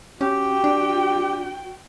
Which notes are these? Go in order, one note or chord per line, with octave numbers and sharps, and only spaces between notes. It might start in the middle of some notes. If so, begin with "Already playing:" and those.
C#4 F#4 G4 G5
D4